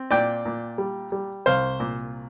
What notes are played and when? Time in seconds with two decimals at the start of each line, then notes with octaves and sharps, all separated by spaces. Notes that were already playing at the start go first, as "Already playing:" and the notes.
Already playing: C4
0.11 A#2 D5 G5
0.45 A#2
0.78 G3
1.12 G3
1.46 C2 C5 F5
1.80 A#2